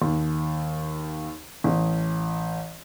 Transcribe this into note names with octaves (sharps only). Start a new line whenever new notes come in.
D#2
A1